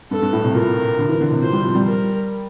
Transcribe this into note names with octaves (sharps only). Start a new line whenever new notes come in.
G2 A4
G2
A2
C3
A#2 A#4
D3
E3
D3
C3
A#2 C5
G3
F3
G3
A#4